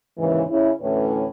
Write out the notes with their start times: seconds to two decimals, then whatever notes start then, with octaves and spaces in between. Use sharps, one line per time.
0.18 D#2 G#2 C#3 E3
0.50 C#3 C#4 E4
0.81 D2 A2 E3 C#4 B4 C#5